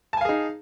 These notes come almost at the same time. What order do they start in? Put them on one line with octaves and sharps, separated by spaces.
A5 G#5 F5 G#4 D#4